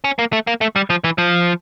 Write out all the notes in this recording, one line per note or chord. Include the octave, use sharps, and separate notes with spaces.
C#4
A#3
A3
A#3
A3
G3
F3
E3
F3